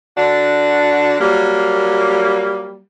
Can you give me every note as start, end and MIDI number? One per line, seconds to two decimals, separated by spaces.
0.18 1.18 50
0.18 1.18 62
0.18 1.18 66
1.20 2.81 54
1.20 2.81 55
1.20 2.81 58